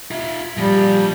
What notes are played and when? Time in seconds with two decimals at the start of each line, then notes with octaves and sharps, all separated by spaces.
0.11 F4 E5
0.57 A#2 F3 G3